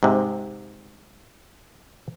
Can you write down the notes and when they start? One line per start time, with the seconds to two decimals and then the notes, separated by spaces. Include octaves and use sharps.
0.03 G#2 C3